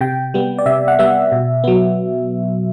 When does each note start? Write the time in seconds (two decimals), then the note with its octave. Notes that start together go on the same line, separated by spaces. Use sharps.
0.01 C3 G5
0.34 G3 B3
0.58 D5
0.66 C3 E5
0.88 F#5
0.99 G3 B3 E5
1.32 B2
1.64 F#3 B3